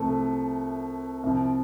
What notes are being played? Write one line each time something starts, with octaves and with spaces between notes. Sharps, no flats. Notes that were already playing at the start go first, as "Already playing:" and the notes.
Already playing: C2 C3 F3 A3
C2 C3 F3